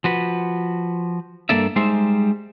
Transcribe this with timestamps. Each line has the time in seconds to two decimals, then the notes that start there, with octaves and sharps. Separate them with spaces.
0.04 F3 F#4 B4
1.49 G2 A#3 A4 D5 E5
1.76 G3 G#3 D#4 C5 E5